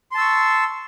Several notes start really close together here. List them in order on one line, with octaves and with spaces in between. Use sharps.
C6 A5 E6 C#6